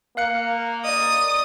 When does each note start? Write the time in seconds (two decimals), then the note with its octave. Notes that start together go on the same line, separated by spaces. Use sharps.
0.17 A#3 F5 F#6 C#7
0.85 D5 D#5 D#6